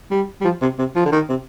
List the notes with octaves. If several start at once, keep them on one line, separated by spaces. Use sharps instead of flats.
G3
G3
F3
C3
C3
F3
D3
D#3
C3